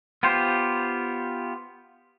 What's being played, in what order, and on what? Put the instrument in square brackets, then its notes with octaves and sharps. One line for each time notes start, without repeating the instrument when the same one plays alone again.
[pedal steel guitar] B3 F4 G4 C5